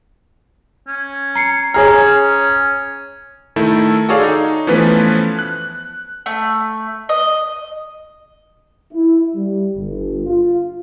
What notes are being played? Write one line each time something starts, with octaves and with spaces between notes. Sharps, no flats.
C#4
A#5 C7 C#7
C#4 G#4 C#5 A#5 F6
D#3 A3 E4 A4
F#4 G#4 A4 C#5 D5 F5
D#4
E3 F3 A3 B3 C#4 B4
F#6
A3
D#5
E4
G3
G1
F4